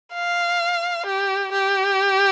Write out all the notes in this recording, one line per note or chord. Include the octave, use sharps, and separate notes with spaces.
F5
G4
G4